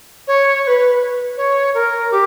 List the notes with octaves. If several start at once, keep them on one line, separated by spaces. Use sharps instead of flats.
C#5
C#5
B4
C#5
A#4
G4